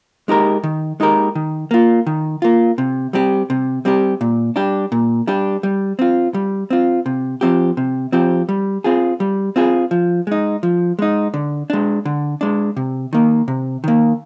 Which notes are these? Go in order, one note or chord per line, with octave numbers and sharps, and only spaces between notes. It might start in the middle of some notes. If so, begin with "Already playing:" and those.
G#3 D#4 G4 A#4
D#3
G#3 D#4 G4 A#4
D#3
A#3 F4
D#3
A#3 F4
C3
G3 C4 G4
C3
G3 C4 G4
A#2
G3 D4 G4
A#2
G3 D4 G4
G3
C4 F4
G3
C4 F4
C3
F3 C4 G4
C3
F3 C4 G4
G3
C4 F4 G#4
G3
C4 F4 G#4
F3
G#3 D#4
F3
G#3 D#4
D3
G#3 D4
D3
G#3 D4
C3
D#3 A#3
C3
D#3 A#3